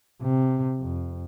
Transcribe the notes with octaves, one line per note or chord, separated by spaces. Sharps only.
C3
F2